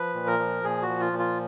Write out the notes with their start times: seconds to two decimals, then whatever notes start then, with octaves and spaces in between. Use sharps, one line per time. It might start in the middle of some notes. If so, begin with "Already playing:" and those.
Already playing: F3 B4
0.14 A#2
0.27 A#4
0.39 F3
0.64 A#2 G#4
0.82 F#4
0.88 F3
1.00 F4
1.12 A#2
1.19 F4